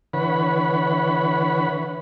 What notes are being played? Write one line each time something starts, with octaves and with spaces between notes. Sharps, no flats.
D3 E3 B4 C#5 F#5 B5